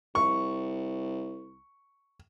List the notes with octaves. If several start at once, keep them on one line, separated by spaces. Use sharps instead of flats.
C2 C#6